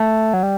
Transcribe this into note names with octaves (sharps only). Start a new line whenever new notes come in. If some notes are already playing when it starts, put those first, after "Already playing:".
Already playing: A3
F#3
G3